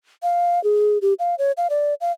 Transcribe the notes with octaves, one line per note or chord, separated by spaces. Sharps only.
F5
G#4
G4
F5
C#5
F5
D5
F5